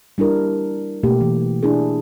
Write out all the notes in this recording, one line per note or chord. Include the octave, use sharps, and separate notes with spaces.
G3 D4 E4 A#4
B2 A3 A#3 G4
E3
D4 E4 G#4